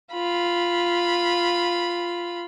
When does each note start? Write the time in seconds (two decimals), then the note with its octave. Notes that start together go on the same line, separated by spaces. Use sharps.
0.13 F4 B5